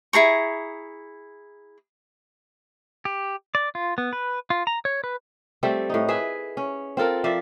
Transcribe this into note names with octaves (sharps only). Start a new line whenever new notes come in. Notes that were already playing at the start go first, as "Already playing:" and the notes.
E4 G#4 A#5 C#6
G4
D5
F4
B3
B4
F4
A#5
C#5
B4
G3 A3 C4 A4
A2 D#4
G#4 B4 E5
C#4
C4 F4 A4 A#4
F3 D5 E5